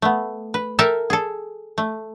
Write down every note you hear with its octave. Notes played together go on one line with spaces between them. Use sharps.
A3 B3
B4
A4 A#4 E5 G5 A5
G#4 A4
A3